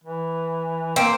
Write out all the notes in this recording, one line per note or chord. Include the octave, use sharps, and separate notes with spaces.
E3
A#3 C4